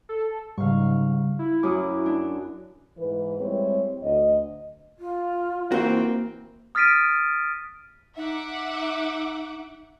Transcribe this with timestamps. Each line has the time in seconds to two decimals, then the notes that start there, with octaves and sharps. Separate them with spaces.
0.09 A4
0.58 G#2 C#3 G3 F5 C#6
1.39 E4
1.63 F#2 F#4 D6 D#6
2.06 D4
2.98 G#2 E3 B4
3.39 G3 G#3 C4 E4 C#5
4.02 D2 D#5
4.99 F4
5.72 E3 A#3 C4 F#4 C5
6.75 D#6 F6 A6 B6 D7 D#7
8.17 D#4 E5 F#5 D6